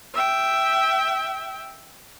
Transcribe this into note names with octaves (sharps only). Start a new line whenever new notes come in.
E5 G5